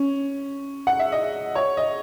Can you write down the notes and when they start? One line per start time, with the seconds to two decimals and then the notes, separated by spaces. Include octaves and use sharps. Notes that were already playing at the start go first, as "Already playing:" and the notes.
Already playing: C#4
0.87 F#5
0.99 E5
1.12 D#5
1.55 C#5
1.77 D#5